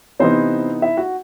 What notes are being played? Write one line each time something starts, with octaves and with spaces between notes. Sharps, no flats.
C3 E3 B3 C4 D#4 C5
E4 E5
F#4 F#5